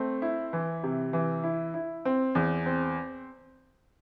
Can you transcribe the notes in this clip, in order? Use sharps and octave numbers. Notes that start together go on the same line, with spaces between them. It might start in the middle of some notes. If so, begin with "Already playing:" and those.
Already playing: A3 C4
E4
E3
C3
E3
E4
E4
C4
E2
C4